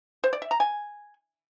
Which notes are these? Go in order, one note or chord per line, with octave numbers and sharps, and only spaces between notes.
C5
D5
E5
A#5
G#5